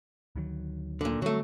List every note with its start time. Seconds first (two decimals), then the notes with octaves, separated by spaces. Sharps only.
0.36 D2 D#3 F#3
1.01 A#2 D3
1.22 D3 F#3 G3 A3 C4